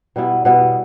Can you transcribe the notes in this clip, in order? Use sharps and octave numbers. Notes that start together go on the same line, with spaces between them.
B2 G3 B3 E4
B2 G3 B3 E4